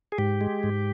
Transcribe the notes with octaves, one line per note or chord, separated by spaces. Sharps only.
G#4
G#2 G4
G#3
G#2